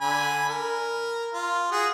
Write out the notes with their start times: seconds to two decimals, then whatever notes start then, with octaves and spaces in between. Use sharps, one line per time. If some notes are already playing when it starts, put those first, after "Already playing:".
0.01 D3 G#5 B5
0.49 A#4
1.34 F4
1.72 F#4 G#4